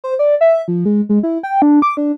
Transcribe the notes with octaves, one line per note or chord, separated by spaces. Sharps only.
C5
D5
E5
F3
G#3
G#3
E4
G5
D4
D6
D4